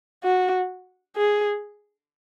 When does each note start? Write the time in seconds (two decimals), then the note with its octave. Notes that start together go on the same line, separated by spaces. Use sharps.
0.24 F#4
1.17 G#4